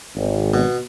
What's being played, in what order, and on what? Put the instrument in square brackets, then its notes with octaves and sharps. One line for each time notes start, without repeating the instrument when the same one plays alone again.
[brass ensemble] G#1
[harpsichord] B2